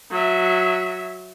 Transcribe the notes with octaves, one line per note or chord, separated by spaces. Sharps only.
F#3 E5